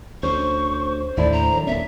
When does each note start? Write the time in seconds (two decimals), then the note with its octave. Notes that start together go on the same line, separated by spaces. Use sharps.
0.23 D2 C#4 C5 C#6
1.17 D#2 A2 D3 E4 D5
1.32 A#5
1.53 D#3 F#3
1.67 D#1 A#3 C#4 E5